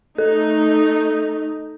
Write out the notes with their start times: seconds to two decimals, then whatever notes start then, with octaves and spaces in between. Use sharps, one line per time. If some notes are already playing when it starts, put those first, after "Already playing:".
0.18 A3 D#4 A4